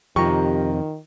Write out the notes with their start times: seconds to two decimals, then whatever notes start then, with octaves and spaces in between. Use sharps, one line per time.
0.16 F2 C3 D#3 F3 G4 A#5 C#6